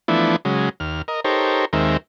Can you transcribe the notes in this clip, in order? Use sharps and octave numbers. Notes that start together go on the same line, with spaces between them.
E3 F3 A3 B3 D4 E4
C#3 F#3 G#3
D#2 F6
A#4 D#5
D#4 G4 A4 A#4 C5 C#5
D#2 D#3 G#3 C4 A#4 E5